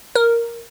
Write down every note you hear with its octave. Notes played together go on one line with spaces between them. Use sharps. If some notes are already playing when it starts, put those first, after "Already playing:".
A#4